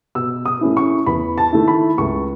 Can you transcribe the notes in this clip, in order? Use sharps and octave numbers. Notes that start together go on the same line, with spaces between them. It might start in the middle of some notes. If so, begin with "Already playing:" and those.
B2 E6
D#6
A3 C#4 E4
C#6
E2 B5
A5
D#3 A3 E4
B5
C#2 C#6